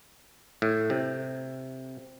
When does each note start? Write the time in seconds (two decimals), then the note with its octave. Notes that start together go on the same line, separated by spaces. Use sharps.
0.62 A2
0.90 C3